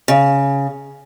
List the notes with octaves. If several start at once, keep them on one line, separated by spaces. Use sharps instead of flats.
C#3